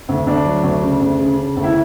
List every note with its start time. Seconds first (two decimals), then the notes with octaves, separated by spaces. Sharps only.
0.09 D2
0.26 D2 D4
0.45 F#3
0.63 D2
0.82 C#3
1.01 D2
1.19 C#3
1.37 C#3
1.56 D2
1.64 E4